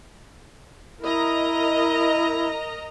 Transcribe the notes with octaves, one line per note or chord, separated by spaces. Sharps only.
E4 A#4 D#5 A#5